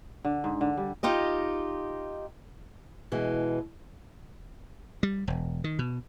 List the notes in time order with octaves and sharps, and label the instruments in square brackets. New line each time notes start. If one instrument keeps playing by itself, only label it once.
[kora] D3
G#2
D3
G3
[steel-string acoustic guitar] D#4 F4 G4 D#5
[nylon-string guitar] B2 E3 G#3
[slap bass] G3
E1
D#3
B2